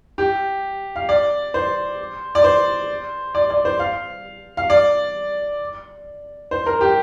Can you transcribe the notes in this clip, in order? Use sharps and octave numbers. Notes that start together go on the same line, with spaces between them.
G4
F5
D5
C5
D5
C5
D5
D5
C5
F5
F5
D5
C5
A#4
G4